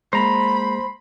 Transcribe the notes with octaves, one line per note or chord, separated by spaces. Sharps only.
G#3 A#3 C5 A#5 B5